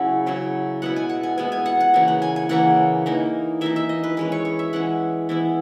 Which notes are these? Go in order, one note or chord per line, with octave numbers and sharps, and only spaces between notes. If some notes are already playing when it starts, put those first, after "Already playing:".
Already playing: C#3 F#3 C#4 E4 F#5
C#3 F#3 C#4 E4
B2 G#3 B3 E4 F#5
G#5
F#5
G#5
B2 G#3 B3 E4 G#5
G#5
F#5
F#5
C#3 E3 A#3
F#5
G#5
G#5
C#3 E3 A#3 F#5
E3 A#3 D#4
E3 A#3 D#4 E5
E5
D#5
B4
E3 G#3 C#4 B4
C#5
C#5
E5
E3 G#3 C#4 F#5
E3 B3 E4